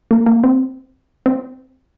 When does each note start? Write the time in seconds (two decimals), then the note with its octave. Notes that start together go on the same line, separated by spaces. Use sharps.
0.11 A#3
0.26 A#3
0.44 C4
1.26 C4